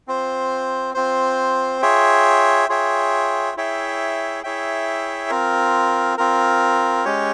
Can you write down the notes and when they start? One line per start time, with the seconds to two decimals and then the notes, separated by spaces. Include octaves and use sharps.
0.08 C4 F4 C5
0.94 C4 F4 C5
1.82 F4 G#4 C#5 E5 G5
2.69 F4 G#4 C#5 E5 G5
3.57 E4 G#4 C#5 E5 G5
4.43 E4 G#4 C#5 E5 G5
5.30 C4 F4 A#4
6.18 C4 F4 A#4
7.05 G#3 C#4 G4 C#5